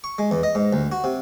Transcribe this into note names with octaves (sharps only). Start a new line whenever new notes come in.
C#6
G#3
E2
D#5
G#2
D2
F#4
C3